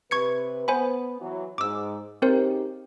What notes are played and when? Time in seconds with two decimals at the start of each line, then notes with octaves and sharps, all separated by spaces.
0.11 C3 B4 C#6 G#6 C#7
0.68 B3 C5 G#5 B5
1.21 E3 F#3
1.58 G#2 D6 E6
2.22 C#3 C4 D#4 G4 A#4 C5